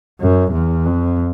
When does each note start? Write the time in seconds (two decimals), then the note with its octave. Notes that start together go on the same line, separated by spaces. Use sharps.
0.21 F#2
0.52 E2
0.86 F2